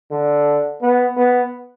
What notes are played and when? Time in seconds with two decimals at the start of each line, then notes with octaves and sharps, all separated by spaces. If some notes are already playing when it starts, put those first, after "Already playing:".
0.11 D3
0.82 B3
1.17 B3